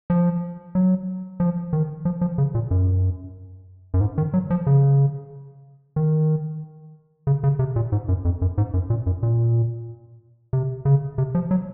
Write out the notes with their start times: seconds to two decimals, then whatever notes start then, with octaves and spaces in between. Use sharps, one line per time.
0.10 F3
0.75 F#3
1.40 F3
1.73 D#3
2.05 F3
2.21 F3
2.38 C#3
2.55 A#2
2.71 F#2
3.94 F#2
4.01 G#2
4.18 D#3
4.34 F#3
4.50 F3
4.67 C#3
5.96 D#3
7.27 C#3
7.44 C#3
7.59 C3
7.76 A#2
7.92 G#2
8.09 F#2
8.25 F2
8.42 F#2
8.58 G#2
8.74 F#2
8.90 A#2
9.07 F#2
9.23 A#2
10.53 C3
10.85 C#3
11.18 C3
11.35 F3
11.51 F#3